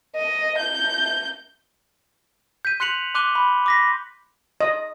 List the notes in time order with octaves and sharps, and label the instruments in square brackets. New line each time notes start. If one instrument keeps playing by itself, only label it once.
[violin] D#5
G6
[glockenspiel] G6 B6 D#7
C6 F#6 B6 C#7 F7 F#7
C6 D6 F#6 D#7 G7
B5
D6 A#6 B6
[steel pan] D#5